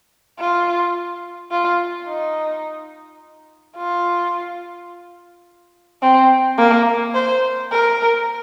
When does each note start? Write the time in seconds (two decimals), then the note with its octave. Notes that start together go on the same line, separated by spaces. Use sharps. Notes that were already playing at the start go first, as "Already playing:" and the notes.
0.39 F4
1.51 F4
2.07 D#4
3.77 F4
6.02 C4
6.58 A#3
7.14 C5
7.72 A#4